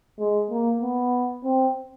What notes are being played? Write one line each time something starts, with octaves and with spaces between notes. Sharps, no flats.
G#3
A#3
B3
C4